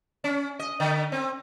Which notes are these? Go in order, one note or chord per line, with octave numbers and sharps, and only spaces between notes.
C#4
D#5
D3
C4